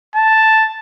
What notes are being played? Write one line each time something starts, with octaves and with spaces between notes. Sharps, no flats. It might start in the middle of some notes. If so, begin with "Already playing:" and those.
A5